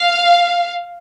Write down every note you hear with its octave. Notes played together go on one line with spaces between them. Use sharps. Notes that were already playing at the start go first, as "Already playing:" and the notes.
Already playing: F5